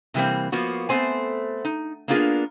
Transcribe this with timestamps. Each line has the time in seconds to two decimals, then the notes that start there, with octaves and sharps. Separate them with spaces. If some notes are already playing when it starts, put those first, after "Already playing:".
0.14 C3 E3 G3 A#3 C4
0.52 F3 A#3 B3 F#4
0.89 A3 B3 C4 C5 G#5
1.65 D#4
2.08 A#3 B3 D4 F4 G#4 A#4